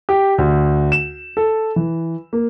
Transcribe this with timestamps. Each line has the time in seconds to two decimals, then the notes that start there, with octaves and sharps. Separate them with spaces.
0.09 G4
0.38 D2
0.92 E7
1.37 A4
1.76 E3
2.33 A#3